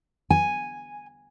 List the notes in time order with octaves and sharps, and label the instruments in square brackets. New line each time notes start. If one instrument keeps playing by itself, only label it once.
[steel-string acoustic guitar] G#5